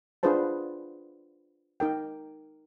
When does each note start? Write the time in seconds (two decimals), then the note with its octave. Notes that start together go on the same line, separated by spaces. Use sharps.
0.23 D4 F4 G#4 B4 C5 A5
1.80 D#4 A#4 G5